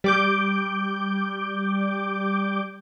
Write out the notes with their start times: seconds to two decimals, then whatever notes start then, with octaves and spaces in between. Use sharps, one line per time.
0.04 G3 D6 G6